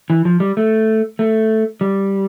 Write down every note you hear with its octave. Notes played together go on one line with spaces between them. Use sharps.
E3
F3
G3
A3
A3
G3